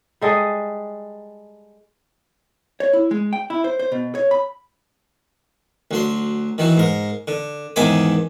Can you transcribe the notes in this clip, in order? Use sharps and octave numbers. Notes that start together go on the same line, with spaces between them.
G3 G#3 A4 D#5
C#5
E4
G#3
G5
E4
C5
C5
B2
C#5
B5
D2 F#3 C6
D#3 E3 F#3
G#2 A#4
D3
E2 G#2 D#3 E5 G#5 D6